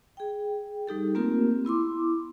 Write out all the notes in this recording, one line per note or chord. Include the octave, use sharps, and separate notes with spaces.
G#4 G5
G3 D#4 G4 A4
A3 A#3 C4 F4 G4 A#4
B3 E4 C6 D6